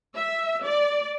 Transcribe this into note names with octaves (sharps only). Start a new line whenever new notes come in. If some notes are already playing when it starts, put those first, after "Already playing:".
E5
D5